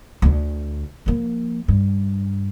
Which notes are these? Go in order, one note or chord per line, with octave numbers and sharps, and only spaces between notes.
D2 D3
F3 A#3
G2